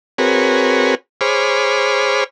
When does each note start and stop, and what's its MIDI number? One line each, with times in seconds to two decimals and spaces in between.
0.18 0.95 60
0.18 0.95 66
0.18 0.95 68
0.18 0.95 70
0.18 0.95 71
0.18 0.95 73
1.21 2.24 68
1.21 2.24 72
1.21 2.24 73
1.21 2.24 83
1.21 2.24 86
1.21 2.24 89